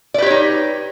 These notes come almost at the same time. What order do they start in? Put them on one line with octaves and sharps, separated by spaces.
D5 B4 G4 C#5 D#4